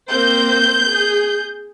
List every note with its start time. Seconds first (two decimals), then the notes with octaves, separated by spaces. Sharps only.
0.10 A#3 C4 C5 G6
0.90 G#4